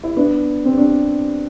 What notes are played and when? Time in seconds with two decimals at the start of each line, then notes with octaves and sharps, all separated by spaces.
0.03 E4
0.17 B3 D4
0.65 C4
0.78 D4